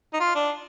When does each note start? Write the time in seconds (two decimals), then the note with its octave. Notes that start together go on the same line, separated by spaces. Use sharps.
0.14 D#4
0.20 F4
0.35 D4